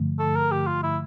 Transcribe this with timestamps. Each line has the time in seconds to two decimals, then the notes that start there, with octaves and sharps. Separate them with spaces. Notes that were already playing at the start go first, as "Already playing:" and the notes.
Already playing: G2 D3 F3 A3
0.19 A4
0.36 A#4
0.51 G4
0.67 F4
0.83 E4